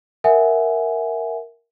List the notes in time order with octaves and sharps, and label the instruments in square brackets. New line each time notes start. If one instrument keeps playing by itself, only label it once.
[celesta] A#4 E5 F#5 G#5